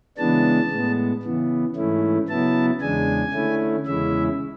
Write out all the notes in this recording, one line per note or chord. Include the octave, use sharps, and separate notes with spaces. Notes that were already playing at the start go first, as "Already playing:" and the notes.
C#3 E3 G#3 B3 D4 A5
A2 G#3 B3
C#3 E3 B3
G#2 E3 A3 C#4 E4
C#3 F#3 B3 E4 A5
E2 C#3 G#3 D4 G#5
D3 A3 C#4 E4
E2 C#3 G#3 C#4 E4 E5